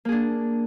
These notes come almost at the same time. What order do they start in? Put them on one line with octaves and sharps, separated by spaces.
A#3 G#4 D4